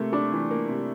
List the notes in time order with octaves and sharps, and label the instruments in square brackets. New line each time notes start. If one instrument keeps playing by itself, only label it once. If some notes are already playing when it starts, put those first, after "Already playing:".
Already playing: [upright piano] C3 A#3 [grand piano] A3
[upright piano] G3 [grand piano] D4
[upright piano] E3
A#3
C3